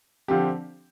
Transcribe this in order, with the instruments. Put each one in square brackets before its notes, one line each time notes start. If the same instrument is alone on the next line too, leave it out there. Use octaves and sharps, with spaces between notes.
[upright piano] D3 F3 C4 G4